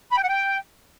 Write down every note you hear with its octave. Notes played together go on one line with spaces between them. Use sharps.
B5
G5
F#5
G5